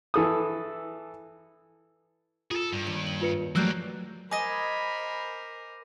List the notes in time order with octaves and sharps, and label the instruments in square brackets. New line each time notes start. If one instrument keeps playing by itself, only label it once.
[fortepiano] E3 A4 D#6
[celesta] F4 [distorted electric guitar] G#4 A4
[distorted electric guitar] G2
[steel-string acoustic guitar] D#2
[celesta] F#7
F4 B4 C#7
[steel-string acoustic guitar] F#3 G3 A3 [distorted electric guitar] A#3 C#4 [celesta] E6 F#6 G6
[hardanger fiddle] A#4 C5 [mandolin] D#5 G#5 [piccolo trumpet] B5 [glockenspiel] D6 A#6 D#7